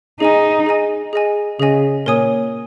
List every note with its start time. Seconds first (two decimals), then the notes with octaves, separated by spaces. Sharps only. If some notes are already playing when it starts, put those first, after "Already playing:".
0.20 D#4 G#4 D#5 G#5
0.66 G#4 D#5 G#5
1.13 G#4 D#5 G#5
1.60 C#3 G#4 D#5 G#5
2.06 A#2 A#4 C#5 G#5 D#6